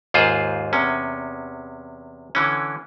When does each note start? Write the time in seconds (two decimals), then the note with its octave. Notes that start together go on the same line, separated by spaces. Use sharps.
0.14 D#2 G#2 F4 G#4 C5
0.73 E2 C3 C#4
2.35 D3 E3 C#4